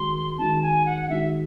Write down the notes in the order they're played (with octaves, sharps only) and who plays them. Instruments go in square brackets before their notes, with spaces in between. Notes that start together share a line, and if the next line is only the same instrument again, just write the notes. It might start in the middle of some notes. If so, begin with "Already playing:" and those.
Already playing: [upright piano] D#3 G#3 D#4 F#4 [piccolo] C6
[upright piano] D#3 G#3 D#4 F#4 [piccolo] A5
[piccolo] G#5
F#5
F#5
[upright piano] D#3 G#3 D#4 F#4 [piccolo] E5